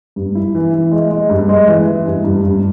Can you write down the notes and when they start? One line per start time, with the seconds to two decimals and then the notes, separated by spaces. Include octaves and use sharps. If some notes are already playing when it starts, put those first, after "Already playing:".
0.16 G2
0.35 E4
0.55 E3
0.74 E3
0.91 G#3
1.11 G#3
1.30 G2
1.49 G#3
1.68 E3
1.86 E3
2.06 G2
2.24 G2
2.43 G2